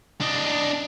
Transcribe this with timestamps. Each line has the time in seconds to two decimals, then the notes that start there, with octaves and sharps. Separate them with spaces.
0.21 D4 D#5